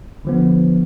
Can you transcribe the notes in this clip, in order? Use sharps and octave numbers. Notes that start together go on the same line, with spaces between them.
D3 F3 B3